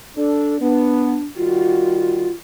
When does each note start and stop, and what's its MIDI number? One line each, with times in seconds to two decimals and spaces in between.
0.17 0.58 62
0.17 0.58 69
0.60 1.16 59
0.60 1.24 62
1.37 2.29 51
1.37 2.29 55
1.37 2.31 65
1.37 2.29 66